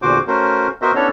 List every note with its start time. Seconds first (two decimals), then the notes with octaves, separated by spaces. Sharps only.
0.02 E2 A#2 D3 F#4 C5 D6
0.27 A3 C#4 F#4 A#4 C5
0.82 B3 F#4 A#4 C5 D#5 E5
0.95 B3 C#4 D4 E4 A4 C#5